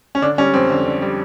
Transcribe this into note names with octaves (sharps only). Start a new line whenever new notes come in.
C#4
D3 D4
G3 C#4
F2 C4
D3
D3
G3